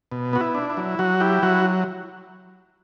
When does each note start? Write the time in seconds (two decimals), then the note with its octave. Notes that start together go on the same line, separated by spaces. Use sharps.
0.12 B2
0.33 B3 F#4
0.41 E4
0.55 D4
0.70 E4
0.77 F#3
0.99 F#3 F#4
1.20 E4 G4
1.43 F#3 F#4